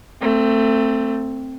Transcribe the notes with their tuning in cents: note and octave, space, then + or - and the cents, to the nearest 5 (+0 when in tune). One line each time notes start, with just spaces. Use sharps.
A3 +25 C4 +0